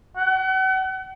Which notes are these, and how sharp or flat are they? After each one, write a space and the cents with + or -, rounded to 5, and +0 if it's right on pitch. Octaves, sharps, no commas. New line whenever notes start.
F#5 +40